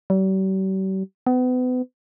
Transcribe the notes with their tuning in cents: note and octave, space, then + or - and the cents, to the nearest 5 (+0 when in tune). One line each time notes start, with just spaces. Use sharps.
G3 -45
B3 +35